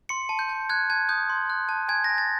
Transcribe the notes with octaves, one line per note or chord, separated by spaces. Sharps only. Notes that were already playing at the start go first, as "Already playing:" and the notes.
C6 C#7
A5
G6
A5
F#6 G#6
A5 G#6
D#6 G6
C6
F#6
A5
G#5 G#6
G#5 A#6
A6